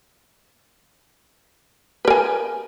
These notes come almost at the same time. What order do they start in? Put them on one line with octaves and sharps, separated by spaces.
B4 A#4 G#5